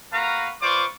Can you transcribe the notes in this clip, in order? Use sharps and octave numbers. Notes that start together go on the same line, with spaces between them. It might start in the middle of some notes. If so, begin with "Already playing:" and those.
A#3 F#4 B4 F5 A#5
F4 B4 C5 D5 C#6 D6